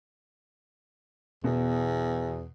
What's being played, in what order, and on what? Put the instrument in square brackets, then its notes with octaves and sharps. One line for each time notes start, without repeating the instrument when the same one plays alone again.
[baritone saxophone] E2 [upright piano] B2